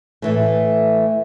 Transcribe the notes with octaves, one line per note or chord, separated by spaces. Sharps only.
A2 E3 A3